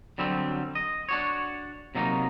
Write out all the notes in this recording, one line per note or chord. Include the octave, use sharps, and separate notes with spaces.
D3 F#3 G3 C4
D#5
D4 F#4 C#5
C3 F#3 A#3 D#4